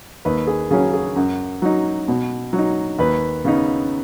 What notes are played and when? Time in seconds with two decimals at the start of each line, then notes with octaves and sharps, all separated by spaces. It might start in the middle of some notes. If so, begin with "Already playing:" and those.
0.25 D#2 B4
0.47 G#4
0.71 C#3 F#3 C#4 G#4
0.93 G#4
1.16 F#2
1.62 F#3 D#4
2.08 B2
2.53 F#3
2.58 D#4
2.99 D#2 B4
3.45 C#3 B3 D#4